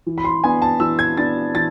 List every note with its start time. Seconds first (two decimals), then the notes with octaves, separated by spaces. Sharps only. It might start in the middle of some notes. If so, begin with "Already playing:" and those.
0.06 E3
0.18 B5
0.24 C6
0.44 B3 D4 G#5
0.62 A5
0.80 E3 E6
0.99 G#6
1.17 B3 D4 A6
1.55 E3 A6